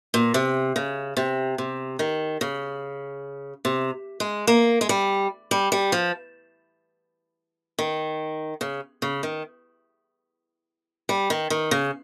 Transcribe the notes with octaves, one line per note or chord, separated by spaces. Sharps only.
A#2
C3
C#3
C3
C3
D#3
C#3
C3
G#3
A#3
G#3
G3
G3
G3
F3
D#3
C#3
C#3
D#3
G3
D#3
D#3
C#3